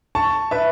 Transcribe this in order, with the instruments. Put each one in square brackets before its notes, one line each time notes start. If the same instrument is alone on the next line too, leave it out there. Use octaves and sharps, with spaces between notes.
[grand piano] A5 C#6
B4 E5